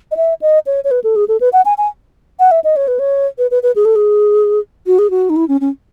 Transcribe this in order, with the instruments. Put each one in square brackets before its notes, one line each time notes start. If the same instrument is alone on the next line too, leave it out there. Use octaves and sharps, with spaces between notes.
[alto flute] D#5
E5
D#5
C#5
C#5
B4
A4
G#4
A4
B4
F#5
G#5
G#5
F#5
E5
D#5
C#5
B4
C#5
B4
B4
B4
G#4
A4
G#4
F#4
G#4
F#4
D#4
E4
C#4
C#4